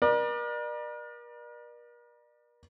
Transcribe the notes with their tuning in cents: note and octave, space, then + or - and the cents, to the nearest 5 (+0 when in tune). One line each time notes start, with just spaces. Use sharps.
A#4 +45 D5 +35